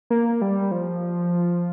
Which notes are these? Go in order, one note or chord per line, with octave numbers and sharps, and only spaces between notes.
A#3
G3
F3